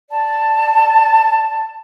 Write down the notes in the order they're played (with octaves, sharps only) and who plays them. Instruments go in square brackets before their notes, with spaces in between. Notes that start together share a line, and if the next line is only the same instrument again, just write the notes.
[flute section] D5 A5